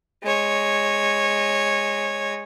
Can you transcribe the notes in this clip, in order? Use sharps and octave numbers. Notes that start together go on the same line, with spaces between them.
G#3 C#5